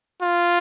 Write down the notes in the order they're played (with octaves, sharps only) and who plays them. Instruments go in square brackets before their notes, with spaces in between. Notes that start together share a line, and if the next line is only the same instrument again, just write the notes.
[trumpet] F4